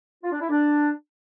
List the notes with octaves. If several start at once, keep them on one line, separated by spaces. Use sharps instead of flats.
F4
D4
E4
D4